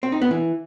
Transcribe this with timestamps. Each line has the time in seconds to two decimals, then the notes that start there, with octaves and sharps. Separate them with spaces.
0.03 C4
0.12 D#4
0.22 B3
0.31 E3